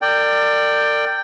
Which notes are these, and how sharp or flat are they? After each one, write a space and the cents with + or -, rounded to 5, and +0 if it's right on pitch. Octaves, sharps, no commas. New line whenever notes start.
A#4 -40 D5 +15 G5 +0